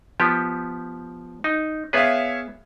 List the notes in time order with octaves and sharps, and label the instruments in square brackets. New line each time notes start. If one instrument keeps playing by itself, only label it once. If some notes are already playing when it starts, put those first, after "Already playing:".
[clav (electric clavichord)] F3 B3 G4
D#4
[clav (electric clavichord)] B3 G#4 B4 [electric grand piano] C#5 E5 F5